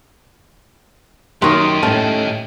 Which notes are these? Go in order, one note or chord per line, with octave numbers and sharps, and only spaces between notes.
F#2 D#3 D#4 G4 C6 C#6 D#6
A2 A3 C#4 A5 F6